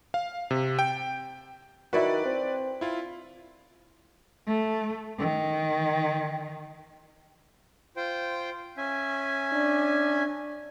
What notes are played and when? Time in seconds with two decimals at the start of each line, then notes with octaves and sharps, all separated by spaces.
0.14 F5
0.51 C3
0.79 G5
1.93 D#3 E4 F#4 B4 D5
2.25 C4
2.81 E4 F4
4.47 A3
5.19 D#3
7.96 F4 C5 G5
8.77 C#4 E5 G#5
9.52 D4